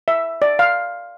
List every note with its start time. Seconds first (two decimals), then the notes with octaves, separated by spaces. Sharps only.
0.08 E5
0.42 D5
0.59 F5